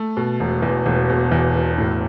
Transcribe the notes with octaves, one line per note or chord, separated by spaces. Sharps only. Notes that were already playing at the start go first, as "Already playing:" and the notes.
Already playing: A3
B2
E1
E2
E1
B2
E2
E1
A2